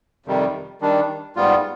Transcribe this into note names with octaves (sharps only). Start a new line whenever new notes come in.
F2 C3 D#3 G3
D#3 G3 D4
G#2 G3 B3 F4